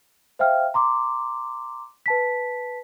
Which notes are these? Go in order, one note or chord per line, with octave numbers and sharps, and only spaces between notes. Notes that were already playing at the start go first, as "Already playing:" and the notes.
C5 E5 F5 G5 F6
A#5 C6 D6
B4 A5 B6